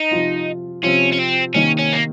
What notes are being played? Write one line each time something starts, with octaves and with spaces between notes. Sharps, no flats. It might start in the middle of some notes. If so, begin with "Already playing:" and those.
Already playing: D#4
C3 F3 C4 F4
C3 F3 C4 C#4 F4
C#4
C4
C3 D#3 A#3 C#4 D#4
C#4
A#3